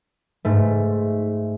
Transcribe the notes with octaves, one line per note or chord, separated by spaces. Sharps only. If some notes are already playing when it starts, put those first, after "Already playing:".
G#2 A3